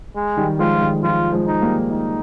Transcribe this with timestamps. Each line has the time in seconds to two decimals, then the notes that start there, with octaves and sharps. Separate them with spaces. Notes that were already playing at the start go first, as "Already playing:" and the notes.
0.15 G#3
0.37 D#3 G3
0.59 F3 G#3 F4
0.81 D#3 G3
1.03 F3 F4
1.32 F3 G#3
1.46 D#4
1.61 G3 A#3
1.91 D#4